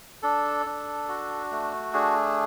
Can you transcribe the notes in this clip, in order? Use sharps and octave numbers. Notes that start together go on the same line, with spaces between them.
D4 A4
D4
F#4
A3
D4 G#4